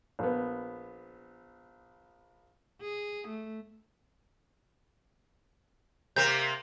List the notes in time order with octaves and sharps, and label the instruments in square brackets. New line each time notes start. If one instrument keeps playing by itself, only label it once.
[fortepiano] A#1 B3
[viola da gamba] G#4
A3
[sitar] C3 A#3 [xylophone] G6